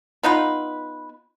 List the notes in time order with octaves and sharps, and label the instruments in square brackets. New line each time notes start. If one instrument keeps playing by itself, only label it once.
[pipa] B3 D#4 F4 B4